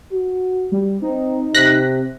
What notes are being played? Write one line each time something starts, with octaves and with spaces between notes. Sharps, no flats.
F#4
G3
C4 D#4
C3 F#6 A#6 B6